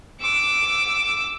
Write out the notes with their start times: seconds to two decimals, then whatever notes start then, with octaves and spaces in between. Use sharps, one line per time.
0.20 D6 E6